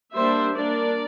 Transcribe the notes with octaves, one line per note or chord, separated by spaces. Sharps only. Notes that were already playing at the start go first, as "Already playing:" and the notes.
G3 A#3 D4 C5 E5
G3 A#3 D4 A#4 D5